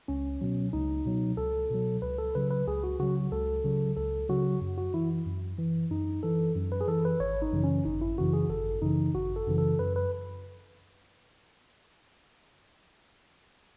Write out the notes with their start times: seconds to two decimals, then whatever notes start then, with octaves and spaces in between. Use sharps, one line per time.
0.08 C#2 C#4
0.41 B2 F#3
0.73 C#2 D#4
1.05 B2 F#3
1.37 C#2 A4
1.70 B2 F#3
2.02 C#2 B4
2.19 A4
2.35 C#3 F#3 B4
2.51 B4
2.68 C#2 G#4
2.84 F#4
2.99 C#3 F#3 F#4
3.32 C#2 A4
3.64 C#3 F#3
3.97 C#2 A4
4.29 C#3 F#3 F#4
4.61 F#2
4.78 F#4
4.94 E3 E4
5.26 F#2
5.59 E3
5.91 F#2 D#4
6.23 E3 A4
6.55 F#2
6.72 B4
6.81 G#4
6.88 E3 A4
7.05 B4
7.20 G#1 C#5
7.42 D#4
7.53 F#2 C#3 E3
7.64 C#4
7.85 G#1 D#4
8.01 E4
8.18 F#2 C#3 E3 F#4
8.33 G#4
8.49 G#1 A4
8.82 F#2 C#3 E3 D#4
9.15 G#1 F#4
9.36 A4
9.47 F#2 C#3 E3
9.58 A4
9.79 F#2 B4
9.96 B4